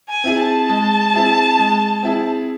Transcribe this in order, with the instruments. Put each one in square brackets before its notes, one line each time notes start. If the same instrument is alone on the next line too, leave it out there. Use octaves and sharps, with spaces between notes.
[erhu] G#5
[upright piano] C4 E4 G#4
[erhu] A5
[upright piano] G#3
C4 E4 G#4
G#3
C4 E4 G#4